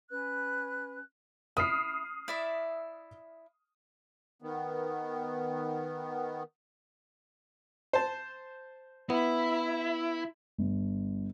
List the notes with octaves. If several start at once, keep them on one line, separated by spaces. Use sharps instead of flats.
C#4 B4 F#6
E4 D#6 F6 C7
E4 D5 E5
D#3 B3
C5 A5
B3 E4 E5 B5
G1